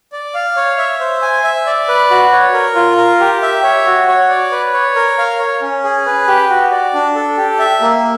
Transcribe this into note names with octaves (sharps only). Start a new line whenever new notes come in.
D5
F5
C#5
E5
C5
G#5
E5
D5
B4
F#4
C#5
A#4
F4
A#4
G4
E5
C#5
F#4
C#5
D5
B4
C#5
A#4
F5
C#5
C#4
G#4
B4
G4
F#4
D5
D4
A4
G4
E5
A#3